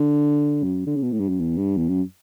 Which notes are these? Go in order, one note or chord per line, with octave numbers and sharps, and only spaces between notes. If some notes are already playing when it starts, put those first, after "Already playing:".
Already playing: D3
F#2
D3
C#3
B2
A2
G2
F#2
E2
G2
E2
F#2